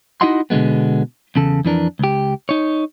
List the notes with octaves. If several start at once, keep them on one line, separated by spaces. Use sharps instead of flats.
D#4 E4 F#4 D#5 F#5 C6
B2 D3 F#3 G#3 B3
E2 C#3 A4
F2 E3 D4 A#4
C#2 G4
D#4 C#5